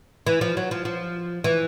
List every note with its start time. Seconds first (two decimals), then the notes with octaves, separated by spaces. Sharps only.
0.27 E3
0.41 F3
0.57 F#3
0.71 F3
0.85 F3
1.44 E3